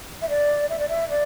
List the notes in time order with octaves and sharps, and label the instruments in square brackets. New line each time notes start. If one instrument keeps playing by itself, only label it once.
[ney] E5
D5
E5
D5
E5
D5